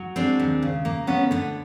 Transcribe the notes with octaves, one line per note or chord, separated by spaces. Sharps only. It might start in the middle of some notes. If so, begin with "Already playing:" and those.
Already playing: F#3
G#3 C4 D4
D#2
C#3
A#3
D2 B3 C#4
D3 B3